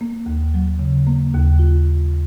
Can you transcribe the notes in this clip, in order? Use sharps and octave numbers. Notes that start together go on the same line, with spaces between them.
A#3
D#2
F#3
C#3
A#3
D#2
F4